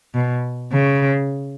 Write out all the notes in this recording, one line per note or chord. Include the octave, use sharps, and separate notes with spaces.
B2
C#3